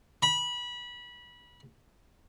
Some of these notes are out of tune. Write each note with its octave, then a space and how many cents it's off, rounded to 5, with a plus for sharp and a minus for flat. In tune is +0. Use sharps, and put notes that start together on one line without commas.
B5 -25